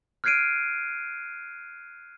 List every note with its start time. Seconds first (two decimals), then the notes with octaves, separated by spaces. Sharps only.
0.24 F6 F#6 G#6 C7 D7 D#7